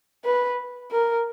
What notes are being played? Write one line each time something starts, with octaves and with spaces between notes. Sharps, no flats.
B4
A#4